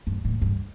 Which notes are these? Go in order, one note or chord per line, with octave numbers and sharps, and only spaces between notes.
G2
A2
G2